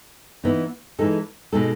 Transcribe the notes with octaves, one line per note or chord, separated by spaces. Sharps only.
E3 B3 D#4
E3 G#3 D#4 A4
B2 G#3 D#4 A4